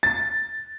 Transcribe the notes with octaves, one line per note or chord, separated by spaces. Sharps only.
A6